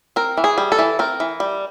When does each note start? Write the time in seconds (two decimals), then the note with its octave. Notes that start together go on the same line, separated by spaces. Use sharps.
0.16 C4 A#4
0.37 E3
0.44 G#4
0.58 G3
0.72 A4
0.79 E3
0.99 C4 A#4
1.20 E3
1.40 G3